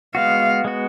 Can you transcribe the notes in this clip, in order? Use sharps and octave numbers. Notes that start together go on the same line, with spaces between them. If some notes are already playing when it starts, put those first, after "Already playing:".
G#3 B3 F#4 F5
G#3 B3 F#4